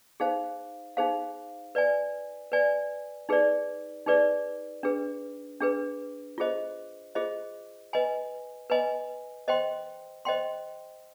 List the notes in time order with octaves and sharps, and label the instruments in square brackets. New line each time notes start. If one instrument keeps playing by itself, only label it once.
[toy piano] D#4 G#4 C5 F5
D#4 G#4 C5 F5
B4 D5 G#5
B4 D5 G#5
D#4 G#4 B4 D5
D#4 G#4 B4 D5
D4 G#4 B4
D4 G#4 B4
F4 G#4 C5 D#5
F4 G#4 C5 D#5
B4 D#5 G#5 B5
B4 D#5 G#5 B5
C5 D#5 G5 C6
C5 D#5 G5 C6